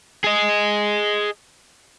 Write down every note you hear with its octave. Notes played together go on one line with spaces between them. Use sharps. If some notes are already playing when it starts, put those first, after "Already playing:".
G#4 D#5